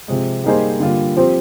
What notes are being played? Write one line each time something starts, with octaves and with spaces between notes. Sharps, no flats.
C3 F3 G#3
G3 A#3 D#4 G#4 C5
D3 G3 A#3 F4
F3 C4 G4 C5